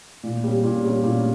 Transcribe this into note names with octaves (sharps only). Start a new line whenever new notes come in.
A#2
G3 C#4
A#2
G3 C#4
A#2